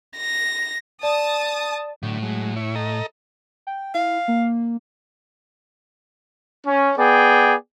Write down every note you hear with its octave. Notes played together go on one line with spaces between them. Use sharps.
A#6
D5 A5 D#6
A2 D3 F#3
F#3 G#3
E4 C#5
A4 D#5 A#5
G5
E4 F5
A#3
C#4
B3 G#4 D5 G5